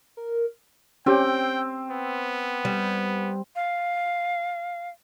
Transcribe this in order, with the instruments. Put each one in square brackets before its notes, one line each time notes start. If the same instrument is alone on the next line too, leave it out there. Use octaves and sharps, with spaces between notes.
[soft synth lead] A#4
[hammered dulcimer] C4 [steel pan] C#4 G4 [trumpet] G5
[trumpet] B3
[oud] G3
[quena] F5